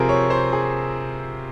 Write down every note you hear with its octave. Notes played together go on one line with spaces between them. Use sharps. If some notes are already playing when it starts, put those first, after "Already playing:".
Already playing: C3 F3 C4 G#4 A#4
C#5
C5
G#4